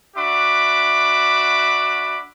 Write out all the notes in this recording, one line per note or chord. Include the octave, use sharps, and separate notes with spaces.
D4 F#4 E5 B5 D6